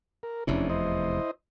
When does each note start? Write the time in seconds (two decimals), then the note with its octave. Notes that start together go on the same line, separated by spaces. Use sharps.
0.23 A#4
0.47 F1 E2 C3 C#4 D4 E4
0.69 E4 C5 D#5